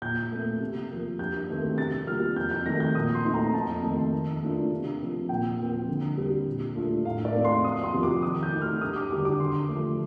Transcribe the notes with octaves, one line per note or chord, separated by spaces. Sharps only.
A#2 G6
A3 C4
C3
F3 A#3
G2 G6
D#3 A3 C4
C3 A6
G3 A#3 F4 F6
F2 G6
G6
D#3 A3 D#4 A#6
G6
A#2 D#6
C6
A3 C4 D#4
A#5
F2 A5
D#3 A3 D#4
D#3
A3 D4 F4
C3
F3 C4
A#2 G5
F3 C4
D3
G3 C4
A#2
A3 D4 F4
A2 F5
D5
A3 C4 D#4
C6
F2 D#6
C6
C3 F3 C4 F4
D6
D#3 D#6
G6
A3 D#4
F6
G2 D#6
D6
D3 G3 D4 D6
D6
D3 C6
F3 A3